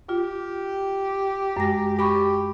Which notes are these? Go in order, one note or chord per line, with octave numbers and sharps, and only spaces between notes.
F4 G4
F#2 G#3 A#6
G4 G5 B5 C#6